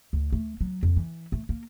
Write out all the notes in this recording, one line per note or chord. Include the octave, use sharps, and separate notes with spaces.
D2
A3
F#3
F2
E3
A3
A#3